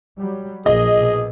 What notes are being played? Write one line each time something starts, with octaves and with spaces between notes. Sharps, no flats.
F#3 G3
A#1 G#4 D#5
A#1 B2